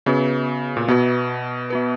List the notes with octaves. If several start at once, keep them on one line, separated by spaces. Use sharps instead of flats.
C#3 B3 F#4 B4
A#2
B2 B3 F#4 B4
B3 F#4 B4